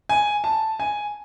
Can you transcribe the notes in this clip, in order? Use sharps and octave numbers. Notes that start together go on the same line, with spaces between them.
G#5
A5
G#5